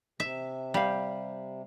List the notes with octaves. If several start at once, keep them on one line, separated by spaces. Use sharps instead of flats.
C3 E5
G3 G4 F5